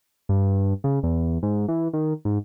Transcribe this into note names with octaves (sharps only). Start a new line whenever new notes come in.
G2
C#3
E2
G#2
E3
D#3
G#2